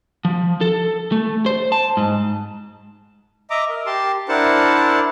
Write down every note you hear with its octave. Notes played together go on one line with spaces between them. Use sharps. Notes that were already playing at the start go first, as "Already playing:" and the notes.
F3
A4
A3
C5
A5
G#2
D#5 E5 A#5 D6
A#4
G4 A5 C6
D4 E4 A#4 C5 F#5 A5